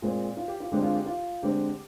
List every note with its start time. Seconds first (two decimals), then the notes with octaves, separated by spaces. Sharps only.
0.02 A#2 G#3 C4
0.37 F4
0.48 G4
0.60 F4
0.72 D3 G#3 C4 G4
0.82 F4
0.94 G4
1.06 F4
1.43 D3 G#3 C4 G4